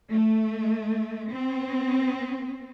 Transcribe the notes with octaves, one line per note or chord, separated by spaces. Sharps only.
A3
C4